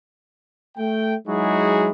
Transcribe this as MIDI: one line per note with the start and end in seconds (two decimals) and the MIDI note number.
0.78 1.15 57
0.78 1.15 79
1.28 1.91 54
1.28 1.91 56
1.28 1.91 63
1.28 1.91 64
1.28 1.91 66
1.28 1.91 68